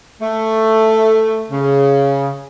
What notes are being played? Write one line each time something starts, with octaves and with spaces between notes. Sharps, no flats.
A3
C#3